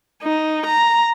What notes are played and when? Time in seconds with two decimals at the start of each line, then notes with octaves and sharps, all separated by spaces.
0.23 D#4
0.66 A#5